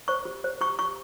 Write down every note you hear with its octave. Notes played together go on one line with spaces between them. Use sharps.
C5 C#6
G4
C5
G4 C#6
G4 C#6